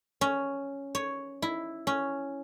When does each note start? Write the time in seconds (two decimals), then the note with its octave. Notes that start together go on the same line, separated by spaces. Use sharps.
0.21 C#4
0.95 C#5
1.42 E4
1.87 C#4